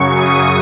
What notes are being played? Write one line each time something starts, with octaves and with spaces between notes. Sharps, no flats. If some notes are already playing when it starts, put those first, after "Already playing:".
Already playing: F#2 C#3 F#3 C#6
D#6